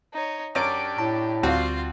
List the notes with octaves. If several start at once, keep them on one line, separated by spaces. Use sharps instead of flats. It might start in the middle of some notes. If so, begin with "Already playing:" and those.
D#4 C#5
F#2 C#4 D4 G4 D6 A6 D7
A2 A5
D2 G3 C4 F4 F#4 F5